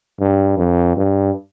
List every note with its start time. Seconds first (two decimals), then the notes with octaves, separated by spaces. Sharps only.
0.20 G2
0.58 F2
0.97 G2